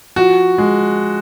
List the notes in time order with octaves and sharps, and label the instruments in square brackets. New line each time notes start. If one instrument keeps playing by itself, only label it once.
[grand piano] F3 F#4
G#3